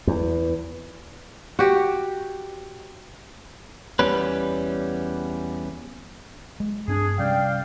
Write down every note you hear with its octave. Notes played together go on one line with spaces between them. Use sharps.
E2
F#4 G4
E2 G3 B3 C#4 B4
G#3
G2 C4 D4 G#4
C3 G3 C#4 D5 F5 G5